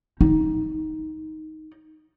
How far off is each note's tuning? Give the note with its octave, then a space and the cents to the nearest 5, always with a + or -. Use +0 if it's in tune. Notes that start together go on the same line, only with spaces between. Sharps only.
D#4 +10